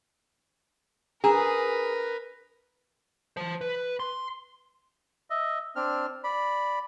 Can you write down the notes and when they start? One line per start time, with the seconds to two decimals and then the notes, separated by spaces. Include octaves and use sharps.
1.24 D4 G#4 A#4 B4 A#5 E6
3.37 C5 A5
3.61 B4
4.00 C6
5.30 D#5 E5
5.76 C4 D4 F6
6.24 D5 B5